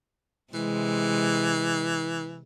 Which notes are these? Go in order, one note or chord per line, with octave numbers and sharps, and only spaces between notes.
C3 E3 G#3